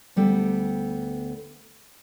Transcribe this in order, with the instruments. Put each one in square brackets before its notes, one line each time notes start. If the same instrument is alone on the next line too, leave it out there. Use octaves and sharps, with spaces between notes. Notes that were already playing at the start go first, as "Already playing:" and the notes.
[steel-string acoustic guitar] D2 G3 B3 A4 G5